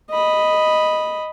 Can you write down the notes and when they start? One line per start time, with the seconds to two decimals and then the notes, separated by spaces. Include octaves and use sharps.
0.10 D#5 B5